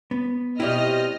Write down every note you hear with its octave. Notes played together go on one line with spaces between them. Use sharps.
B3
B2 G3 C4 E4 D5 D#5 F6